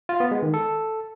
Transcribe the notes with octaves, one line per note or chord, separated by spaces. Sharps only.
F4
B3
G#3
D#3
A4